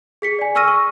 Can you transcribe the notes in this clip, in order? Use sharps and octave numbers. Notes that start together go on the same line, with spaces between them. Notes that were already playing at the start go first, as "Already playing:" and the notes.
G#4 B6 C#7
D5 G#5
G#5 C#6 E6 F6 A#6 D#7
C#6